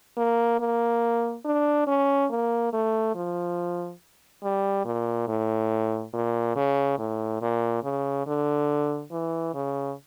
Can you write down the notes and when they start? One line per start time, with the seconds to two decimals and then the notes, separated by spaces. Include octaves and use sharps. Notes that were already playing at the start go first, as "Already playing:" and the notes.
0.18 A#3
0.60 A#3
1.45 D4
1.87 C#4
2.31 A#3
2.73 A3
3.15 F3
4.43 G3
4.85 A#2
5.28 A2
6.13 A#2
6.56 C#3
6.99 A2
7.42 A#2
7.84 C#3
8.27 D3
9.12 E3
9.54 C#3